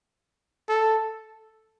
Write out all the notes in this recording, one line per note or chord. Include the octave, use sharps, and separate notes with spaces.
A4